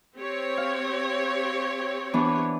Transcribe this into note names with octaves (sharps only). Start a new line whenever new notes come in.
C4 G4 C#5
F5
E3 B3 D4